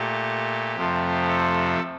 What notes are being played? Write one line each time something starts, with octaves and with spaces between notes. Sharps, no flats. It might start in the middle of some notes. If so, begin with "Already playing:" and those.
Already playing: A#2 A3 G4
F2 C3 F3 A3
A4